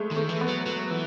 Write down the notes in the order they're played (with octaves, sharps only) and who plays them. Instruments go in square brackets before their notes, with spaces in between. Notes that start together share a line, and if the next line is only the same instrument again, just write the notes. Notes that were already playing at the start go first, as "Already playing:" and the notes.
Already playing: [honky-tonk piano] G#3 A3
[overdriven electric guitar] D#3
[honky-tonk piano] A3
[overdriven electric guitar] E3
[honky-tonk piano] B3
[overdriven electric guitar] F#3
F#3
E3